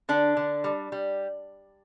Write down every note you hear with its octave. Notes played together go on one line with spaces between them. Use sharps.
D3 D4
D3
G3
G3